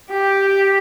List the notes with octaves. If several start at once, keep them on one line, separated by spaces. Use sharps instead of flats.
G4